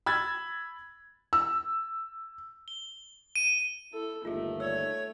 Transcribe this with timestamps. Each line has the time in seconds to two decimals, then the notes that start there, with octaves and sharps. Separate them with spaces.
0.06 B5 E6 G#6 A6
1.33 E6
2.68 G7
3.36 D#7
3.93 E4 A4
4.25 G1 D#2 A3 D#4 F4 G#4
4.60 C#5 D5 E6